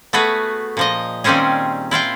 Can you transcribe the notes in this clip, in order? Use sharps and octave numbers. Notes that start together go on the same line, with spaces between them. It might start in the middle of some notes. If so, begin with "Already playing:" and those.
A3 B3 F#4 G#4 B4
A#2 F3 D#5
A#2 D#3 G3 C4 C#4 G#4
E4 F4 F5 G5